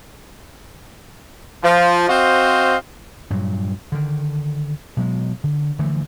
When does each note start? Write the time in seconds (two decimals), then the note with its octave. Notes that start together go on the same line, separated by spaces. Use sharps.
1.64 F3
2.09 C4 F#4 C5 D#5 F5
3.30 G2 A#2 F#3
3.92 D3 D#3
4.97 B2 F#3 G#3
5.44 D3
5.79 D3 E3 F3 A3